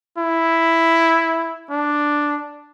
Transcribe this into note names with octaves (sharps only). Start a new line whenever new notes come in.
E4
D4